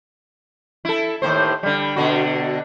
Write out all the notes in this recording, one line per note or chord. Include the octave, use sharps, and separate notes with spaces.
E4 A4
D#2 A2 C5
D3 G3
B2 D3 F#4